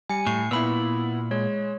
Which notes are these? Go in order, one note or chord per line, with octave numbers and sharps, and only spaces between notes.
G3 G#5 C#7
A2 C#6 C7
A#2 B3 E4 B5 E6
G#3 C#5